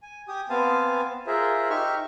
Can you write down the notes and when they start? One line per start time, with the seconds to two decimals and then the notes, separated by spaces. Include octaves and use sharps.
0.03 G#5
0.28 G4 G#5 D#6
0.50 B3 C4 F5 G#5 A5
1.27 F4 G#4 A#4 C5 E5
1.70 D#4 G4 E5 C#6 F6